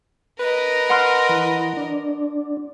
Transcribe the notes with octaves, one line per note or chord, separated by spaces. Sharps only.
A#4 B4 D#5
F#5 C6 F6
E3
D4